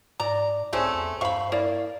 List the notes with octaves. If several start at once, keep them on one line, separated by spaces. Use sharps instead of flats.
G#2 D5 A#5
B1 A3 C4 C#4 G#4
E2
G2 C5 F5 B5 C#6
A#3 E4 D5 F5